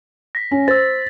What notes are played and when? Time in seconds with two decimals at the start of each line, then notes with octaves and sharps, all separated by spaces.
0.35 A#6 B6
0.51 C#4
0.68 C5 E6 A6